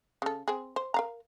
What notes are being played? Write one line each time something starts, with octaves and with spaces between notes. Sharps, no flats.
C#3 A4
C4 G#4
C5
A#4 F5 A#5